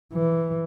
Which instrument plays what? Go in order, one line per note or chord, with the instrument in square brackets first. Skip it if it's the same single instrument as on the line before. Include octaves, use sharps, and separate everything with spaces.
[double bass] E3